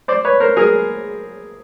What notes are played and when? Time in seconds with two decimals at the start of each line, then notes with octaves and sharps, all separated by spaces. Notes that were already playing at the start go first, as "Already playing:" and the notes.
0.08 C5 D5
0.25 B4 C#5
0.40 A#4 C5
0.56 G#4 A#4